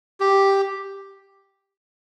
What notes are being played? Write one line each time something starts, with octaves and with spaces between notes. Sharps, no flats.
G4